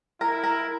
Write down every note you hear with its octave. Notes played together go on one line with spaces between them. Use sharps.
E4 A#4
A#4